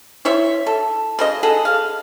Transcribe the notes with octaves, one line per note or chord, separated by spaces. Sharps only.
E4 C5 C#5 E5
A4
C#3 C5 D#5
G#4 A4 F#5
F5